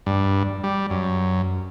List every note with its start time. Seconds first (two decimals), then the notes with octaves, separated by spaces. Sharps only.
0.06 G2
0.64 G3
0.90 F#2